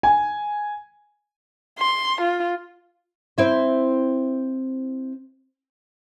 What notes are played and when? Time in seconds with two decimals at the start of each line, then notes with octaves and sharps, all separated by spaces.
0.03 G#5
1.79 C6
2.21 F4
3.38 C4 E4 C5